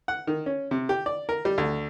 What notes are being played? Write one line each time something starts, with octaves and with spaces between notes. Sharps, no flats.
F#5
D#3
C#4
C3
G4
D5
A#4
G3
D2